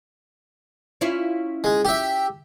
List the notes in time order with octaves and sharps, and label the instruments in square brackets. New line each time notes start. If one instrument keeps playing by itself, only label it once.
[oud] C#4 E4 F4
[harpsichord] G#3
G4 E5